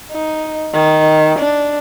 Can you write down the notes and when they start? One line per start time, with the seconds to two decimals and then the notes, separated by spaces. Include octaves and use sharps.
0.12 D#4
0.74 D#3
1.39 D4